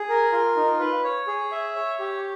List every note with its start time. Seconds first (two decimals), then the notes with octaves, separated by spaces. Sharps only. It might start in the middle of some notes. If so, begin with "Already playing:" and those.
Already playing: G#4
0.09 A#4
0.32 F4
0.56 D#4
0.80 B4
1.04 C#5
1.27 G#4
1.52 E5
1.75 C#5
2.00 G4